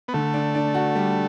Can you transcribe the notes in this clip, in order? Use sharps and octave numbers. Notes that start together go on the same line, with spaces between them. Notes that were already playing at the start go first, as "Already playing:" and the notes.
B3
D3 A3
D4
D4
F#4
G3